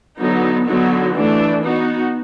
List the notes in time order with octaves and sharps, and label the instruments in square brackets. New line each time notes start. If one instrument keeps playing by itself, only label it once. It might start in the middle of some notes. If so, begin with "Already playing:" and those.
[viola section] D3 F#3 B3 D#4
D3 F#3 B3 D#4 F#4
E3 A3 D4
B3 D#4 F#4